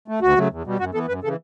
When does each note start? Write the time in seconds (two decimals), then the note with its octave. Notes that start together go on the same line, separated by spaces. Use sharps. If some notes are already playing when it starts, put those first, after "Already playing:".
0.08 A3
0.22 D2 F#4
0.36 C#3 F#3 A3
0.51 E2
0.65 B2 G3
0.79 F#2 F#4
0.94 E3 B3 A4
1.08 F#2 B4
1.23 C#3 E3 A4